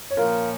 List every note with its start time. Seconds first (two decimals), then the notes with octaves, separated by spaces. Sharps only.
0.10 C#5
0.17 A#2 F3 C#4 F4 A#4